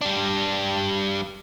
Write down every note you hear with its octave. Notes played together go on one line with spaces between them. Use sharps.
G3 D4